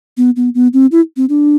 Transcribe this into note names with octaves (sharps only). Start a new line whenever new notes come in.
B3
B3
B3
C4
E4
C4
D4